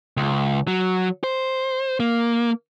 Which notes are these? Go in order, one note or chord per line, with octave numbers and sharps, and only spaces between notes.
C#2
F#3
C5
A#3